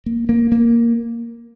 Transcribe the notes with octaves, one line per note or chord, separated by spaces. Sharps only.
A#3
A#3
A#3